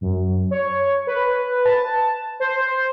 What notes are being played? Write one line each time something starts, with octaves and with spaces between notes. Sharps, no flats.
F#2
C#5
B4
A5
C5